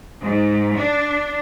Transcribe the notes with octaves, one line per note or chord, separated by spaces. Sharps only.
G#2
D4